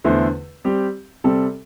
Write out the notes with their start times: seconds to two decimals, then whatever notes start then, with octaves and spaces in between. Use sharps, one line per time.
0.04 E2 D3 A3 E4 C5
0.64 G3 C4 G4
1.24 C3 G3 C4 A4